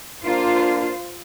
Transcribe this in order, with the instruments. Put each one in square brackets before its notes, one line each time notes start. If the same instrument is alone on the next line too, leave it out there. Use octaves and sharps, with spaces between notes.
[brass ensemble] A#3 D4 [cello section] F4 C5